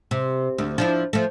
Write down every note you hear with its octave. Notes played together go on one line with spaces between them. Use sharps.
C3
D2
F3 D4 E4
F3 A3